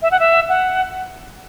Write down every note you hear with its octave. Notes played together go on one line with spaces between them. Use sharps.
E5
F#5
E5
F#5